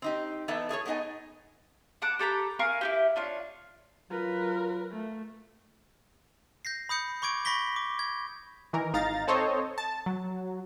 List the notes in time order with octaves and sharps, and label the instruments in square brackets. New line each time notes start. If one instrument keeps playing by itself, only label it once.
[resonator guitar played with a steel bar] C4 D#4 G4
E3 B3 D#4 A4 D5 E5
A3 G#4 A4 C#5
A3 B3 D#4 D#5 G#5
[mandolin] F#5 A5 D6 F#6
G4 A4 A#5 B5
A#4 F5 G#5 C#6
E4 F#4 G4
D4 F4 C#5
[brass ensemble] F#3 F4 [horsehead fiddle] A#4 B4
[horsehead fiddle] A3
[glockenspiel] G6 A#6 C7
B5 D#6 G6 C#7
B5 C#6 D6 G#6 D7
B5 C#6 A#6 B6 G7
D6
G#6
[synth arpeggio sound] D#3 E3 A#4
G#1 D#4 F5 A#5 A6
C4 A4 C5 C#5 D#5
A5
F#3